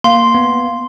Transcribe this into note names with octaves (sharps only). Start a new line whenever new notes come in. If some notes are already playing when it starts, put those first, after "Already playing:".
A#3 F5 C6
B3